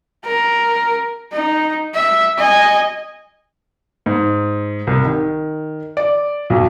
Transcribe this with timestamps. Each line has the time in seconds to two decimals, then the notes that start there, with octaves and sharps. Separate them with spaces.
0.25 A#4
1.32 D#4
1.94 E5
2.38 D#5 G#5
4.06 G#2
4.87 C2
5.05 D#3
5.97 D5
6.50 B1